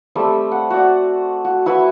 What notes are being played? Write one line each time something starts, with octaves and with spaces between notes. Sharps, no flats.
G3 A3 C4 E6
F#5
F#4 D5
F#4
E4 F#4 B4 E5